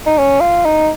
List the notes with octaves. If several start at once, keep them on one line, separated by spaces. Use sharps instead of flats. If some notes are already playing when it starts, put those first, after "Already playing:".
D#4
C#4
F4
D#4